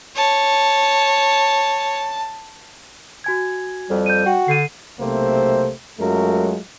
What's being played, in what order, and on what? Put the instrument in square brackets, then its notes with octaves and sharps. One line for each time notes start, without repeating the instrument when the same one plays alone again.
[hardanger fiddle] C#5 [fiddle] A5
[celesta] F#4 G#5 G#6
[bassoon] F2 [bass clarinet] G3
[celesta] G6 D#7
[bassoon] F#4 [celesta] G5
[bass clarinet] D3 [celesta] C7 D#7
[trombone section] B1 C3 A3 A#3 C4 C5
F#2 F#3 G#3 A3 F4 A#4